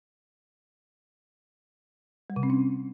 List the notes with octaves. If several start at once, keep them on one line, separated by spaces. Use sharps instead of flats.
G3
C3
C4
C#4